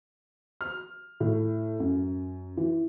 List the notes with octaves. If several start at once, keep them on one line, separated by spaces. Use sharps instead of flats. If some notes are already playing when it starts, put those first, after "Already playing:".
F6
A2
F#2
E3